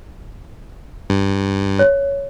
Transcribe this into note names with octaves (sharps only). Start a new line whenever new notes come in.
G2
C#5